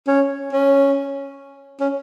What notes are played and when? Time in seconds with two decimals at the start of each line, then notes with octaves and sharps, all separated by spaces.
0.08 C#4
0.53 C#4
1.81 C#4